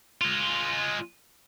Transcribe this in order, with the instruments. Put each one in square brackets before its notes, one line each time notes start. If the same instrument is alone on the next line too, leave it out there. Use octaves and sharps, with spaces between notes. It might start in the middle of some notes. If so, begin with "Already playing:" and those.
[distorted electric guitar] G#3 F4